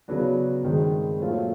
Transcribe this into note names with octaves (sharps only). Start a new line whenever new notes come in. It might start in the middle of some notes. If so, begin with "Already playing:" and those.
C#3 F#3 B3 D4 F#4
G2 D#3 G#3 C4
A#2 F#3 A3 C4 F4